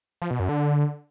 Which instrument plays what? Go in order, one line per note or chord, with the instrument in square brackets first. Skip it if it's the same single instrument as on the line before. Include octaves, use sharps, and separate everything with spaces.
[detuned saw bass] F3
B2
F#2
D3